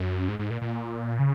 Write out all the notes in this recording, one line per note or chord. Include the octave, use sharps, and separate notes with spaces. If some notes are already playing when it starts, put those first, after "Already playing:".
Already playing: F#2
G#2
G#2
A#2
A#2
C#3